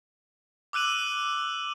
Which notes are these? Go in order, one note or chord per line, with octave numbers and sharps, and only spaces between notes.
D6 E6 F#6 D#7 F#7